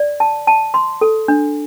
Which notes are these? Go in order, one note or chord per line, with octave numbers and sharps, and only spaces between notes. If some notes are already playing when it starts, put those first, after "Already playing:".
Already playing: D5
A5
A5
C6
A4
D4